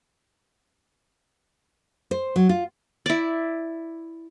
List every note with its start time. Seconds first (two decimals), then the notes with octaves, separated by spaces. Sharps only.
2.11 C5
2.36 F#3
2.49 F4
3.06 E4 D5